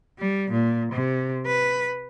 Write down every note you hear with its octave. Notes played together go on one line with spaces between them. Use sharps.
G3
A#2
C3
B4